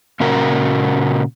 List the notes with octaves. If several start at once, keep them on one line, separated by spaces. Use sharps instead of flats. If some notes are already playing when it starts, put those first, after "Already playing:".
A#2 C#3 F#4 A#4